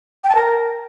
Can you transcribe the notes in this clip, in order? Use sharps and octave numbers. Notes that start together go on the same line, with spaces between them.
G5
A5
A#4